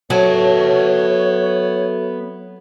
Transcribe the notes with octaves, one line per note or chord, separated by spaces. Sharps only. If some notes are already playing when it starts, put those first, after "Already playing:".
F#3 B3 F#4 A4 C#5 E5 A5